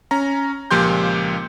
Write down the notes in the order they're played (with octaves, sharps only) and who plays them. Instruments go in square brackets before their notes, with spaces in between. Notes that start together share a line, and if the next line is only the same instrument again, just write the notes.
[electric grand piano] C#4 A#5
C#2 A#2 F3 G4 C6 G6